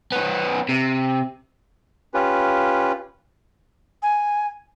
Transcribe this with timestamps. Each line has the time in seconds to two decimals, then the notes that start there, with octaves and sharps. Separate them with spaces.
0.12 B3 C#4
0.69 C3
2.14 C#4 F4 G4 B4
4.02 G#5